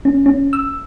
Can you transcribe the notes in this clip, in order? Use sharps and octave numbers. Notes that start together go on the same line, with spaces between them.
C#4
C#4
E6